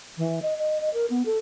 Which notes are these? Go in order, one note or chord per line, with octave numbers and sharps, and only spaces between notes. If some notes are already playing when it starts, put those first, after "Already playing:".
E3
D#5
D#5
D#5
A#4
B3
A4